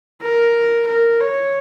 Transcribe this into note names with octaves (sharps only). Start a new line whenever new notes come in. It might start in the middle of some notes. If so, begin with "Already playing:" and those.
A#4
A#4
C#5